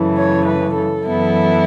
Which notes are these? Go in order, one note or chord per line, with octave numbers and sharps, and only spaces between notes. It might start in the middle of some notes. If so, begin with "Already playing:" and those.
Already playing: F#2 C#3 E3 A3
C#5
B4
A4
F#2 E3 B3 E4